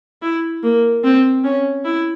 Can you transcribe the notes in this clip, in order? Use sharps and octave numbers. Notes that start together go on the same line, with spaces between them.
E4
A#3
C4
C#4
E4